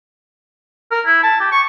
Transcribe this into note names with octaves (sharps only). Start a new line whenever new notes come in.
A#4
E4
A5
G4
C#6